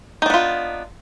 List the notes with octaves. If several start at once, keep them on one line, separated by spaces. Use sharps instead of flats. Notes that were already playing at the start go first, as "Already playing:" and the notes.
B3 D4 D#4 F4